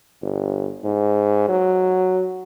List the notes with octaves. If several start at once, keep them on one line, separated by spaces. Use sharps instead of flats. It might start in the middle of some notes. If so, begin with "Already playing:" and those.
G1
G#2
F#3